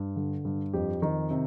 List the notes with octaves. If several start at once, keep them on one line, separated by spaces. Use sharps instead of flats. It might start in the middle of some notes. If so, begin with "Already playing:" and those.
Already playing: G2
D3
G2
F2 G4
D#3
C3